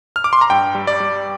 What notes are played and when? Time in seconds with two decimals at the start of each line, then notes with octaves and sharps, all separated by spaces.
0.16 F6
0.24 D6
0.33 C6
0.41 A#5
0.50 G2 G5
0.75 G3
0.87 D5
1.00 G3